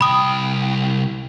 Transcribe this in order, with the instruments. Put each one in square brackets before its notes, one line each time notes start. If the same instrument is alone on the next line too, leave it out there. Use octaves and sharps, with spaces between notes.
[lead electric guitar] C2 G5 [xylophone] B5 D#6